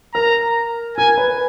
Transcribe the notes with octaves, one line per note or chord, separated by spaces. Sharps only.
A#4 A#5
A#4 G#5
B4